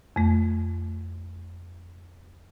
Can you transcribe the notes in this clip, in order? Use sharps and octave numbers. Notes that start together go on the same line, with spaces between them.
F2 A3